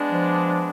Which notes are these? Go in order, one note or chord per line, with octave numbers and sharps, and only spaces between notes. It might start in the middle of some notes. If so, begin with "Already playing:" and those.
Already playing: G#3 B3 D4
F3